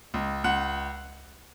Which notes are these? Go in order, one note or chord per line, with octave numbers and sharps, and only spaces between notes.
C#2
C#2 F#5